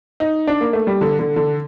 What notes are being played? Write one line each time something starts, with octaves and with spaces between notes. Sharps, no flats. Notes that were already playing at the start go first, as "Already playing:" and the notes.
D#4
D4
A#3
A3
G3
D3
D3
D3